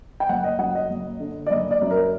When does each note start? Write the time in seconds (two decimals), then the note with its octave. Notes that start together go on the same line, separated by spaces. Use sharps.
0.20 G5
0.29 F#1 F#5
0.44 D#5
0.59 F#2 F#5
0.75 D#5
0.90 F#1
1.20 D3
1.47 D5
1.50 F#1 D#5
1.71 D5
1.81 F#2
1.91 A#4